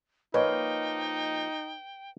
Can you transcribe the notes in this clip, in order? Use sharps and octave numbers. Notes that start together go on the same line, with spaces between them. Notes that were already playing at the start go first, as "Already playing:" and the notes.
F3 A#3 D#4 B4 C#5 D#5 G5